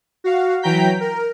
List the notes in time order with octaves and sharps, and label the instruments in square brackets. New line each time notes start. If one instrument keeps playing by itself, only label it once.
[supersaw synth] F#4 F5
E3 F#3 G5 A#5 G6 B6
A#4